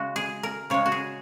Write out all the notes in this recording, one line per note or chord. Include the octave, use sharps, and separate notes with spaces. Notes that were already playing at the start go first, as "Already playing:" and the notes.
Already playing: C#3 G#3 F#4
G#4
A#4
C#3 G#3 C#5
F#4
G#4